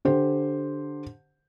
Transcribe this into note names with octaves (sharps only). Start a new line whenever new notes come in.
D3 G4 C5